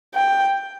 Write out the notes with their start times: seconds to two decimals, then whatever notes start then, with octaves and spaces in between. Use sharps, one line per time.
0.14 G5